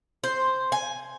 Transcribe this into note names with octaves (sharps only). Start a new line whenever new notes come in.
C5
G#5